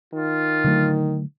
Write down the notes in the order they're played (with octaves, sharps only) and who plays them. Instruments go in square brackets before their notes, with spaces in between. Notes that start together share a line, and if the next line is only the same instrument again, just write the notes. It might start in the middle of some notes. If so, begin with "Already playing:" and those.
[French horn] D#3 [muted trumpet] F4
[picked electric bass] D3 F#3 A3